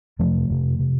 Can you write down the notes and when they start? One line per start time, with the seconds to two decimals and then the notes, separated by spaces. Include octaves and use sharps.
0.19 F2 C3 F3 A3
0.50 F2 C3
0.79 C3